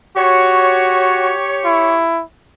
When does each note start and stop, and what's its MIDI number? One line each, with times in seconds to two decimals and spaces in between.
0.16 1.33 66
0.16 2.07 67
0.16 2.07 73
1.65 2.22 64